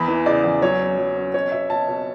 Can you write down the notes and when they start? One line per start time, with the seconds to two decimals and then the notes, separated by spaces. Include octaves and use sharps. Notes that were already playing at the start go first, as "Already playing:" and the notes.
Already playing: E2 B5
0.08 E3
0.26 C#3 D5
0.44 E2
0.62 F#3 C#5
0.80 C#4
0.98 F#3
1.16 C#4
1.34 B2 C#5
1.52 B2 E5
1.70 B2 A5
1.88 B2